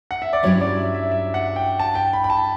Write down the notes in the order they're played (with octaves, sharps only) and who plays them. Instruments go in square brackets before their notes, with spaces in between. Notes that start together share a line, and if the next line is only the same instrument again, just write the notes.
[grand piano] F#5
E5
D5
[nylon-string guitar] G2 F#3 C#4 E4 G4 [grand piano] C#5
[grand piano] D5
E5
E5
E5
F#5
G5
A5
G5
B5
B5
A5